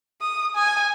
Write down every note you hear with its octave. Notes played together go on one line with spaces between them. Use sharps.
D#6
G#5